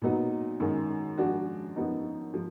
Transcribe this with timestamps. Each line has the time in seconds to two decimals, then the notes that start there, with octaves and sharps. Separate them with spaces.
0.02 A#2 F#3 B3 D#4
0.60 F#2 D#3 G#3
1.18 F3 G#3 D4 F#4
1.76 F#2 F3 B3 D#4
2.34 F3